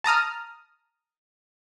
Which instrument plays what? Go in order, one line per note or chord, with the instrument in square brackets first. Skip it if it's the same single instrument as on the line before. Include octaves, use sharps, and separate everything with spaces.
[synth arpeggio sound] A5 A#5 D#6 F6